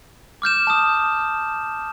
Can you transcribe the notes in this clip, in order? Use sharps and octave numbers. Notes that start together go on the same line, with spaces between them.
D6 F6 G6 E7
A5 D#6